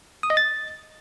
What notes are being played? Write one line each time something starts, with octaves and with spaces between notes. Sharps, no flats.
D#6
D#5
A6